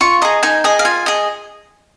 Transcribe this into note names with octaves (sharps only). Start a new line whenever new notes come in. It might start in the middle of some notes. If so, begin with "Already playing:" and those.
F4 C#6
G#4 D#5 A#5
D#4 G#5
G#4 D#5 G#5
F5
F4 G#5
G#4 D#5